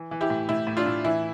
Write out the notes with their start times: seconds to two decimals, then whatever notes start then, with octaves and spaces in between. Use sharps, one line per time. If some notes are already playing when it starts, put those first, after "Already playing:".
Already playing: E3
0.11 E3
0.21 E4 G4
0.30 A2
0.49 A2 E4
0.67 A2
0.77 D4 F4
0.86 A2
1.04 E3 E4